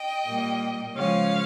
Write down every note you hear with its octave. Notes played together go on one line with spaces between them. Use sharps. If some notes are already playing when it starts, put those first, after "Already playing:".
Already playing: D#5 G5
A#2 G3 A#3
C#3 F3 G#3 C#4 C#5 F5